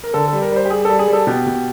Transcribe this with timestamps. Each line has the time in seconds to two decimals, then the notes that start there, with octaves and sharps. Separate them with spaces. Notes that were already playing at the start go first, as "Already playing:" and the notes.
0.04 A#4
0.14 D3 A4
0.28 G3 A4
0.42 A#4
0.52 G3 C5
0.65 G4
0.70 G3 G#4
0.85 G3 A4
0.99 G#4
1.08 G3 A4
1.27 B2 G4
1.47 B2